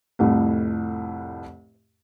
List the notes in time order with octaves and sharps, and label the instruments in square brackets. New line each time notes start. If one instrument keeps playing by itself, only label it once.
[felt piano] C2 F2 A2